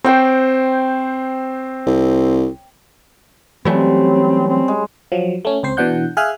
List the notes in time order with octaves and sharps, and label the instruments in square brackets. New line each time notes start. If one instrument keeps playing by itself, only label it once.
[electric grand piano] C4 C5 [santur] C#5 G5
[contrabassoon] C2
[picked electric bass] E3 F#3 A3 [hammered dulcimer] G3 C#4 [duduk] C4
[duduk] C4
[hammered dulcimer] G#3
[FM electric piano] F3 F#3
A3 C#4
C#2 C4 C5 C7
B2 E3 D4 F#5 G6
G#4 E5 F5 G#5 F6 F#6